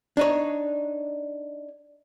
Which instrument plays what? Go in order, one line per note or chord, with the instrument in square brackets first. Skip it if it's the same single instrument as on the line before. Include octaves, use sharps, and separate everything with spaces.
[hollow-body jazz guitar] D4 D#4 C#5